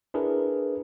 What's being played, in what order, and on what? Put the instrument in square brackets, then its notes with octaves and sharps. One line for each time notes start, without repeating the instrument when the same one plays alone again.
[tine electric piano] D4 E4 G#4 A#4 B4